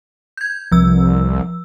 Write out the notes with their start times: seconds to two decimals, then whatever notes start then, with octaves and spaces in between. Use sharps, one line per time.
0.37 G6 G#6
0.72 C2 F3 E6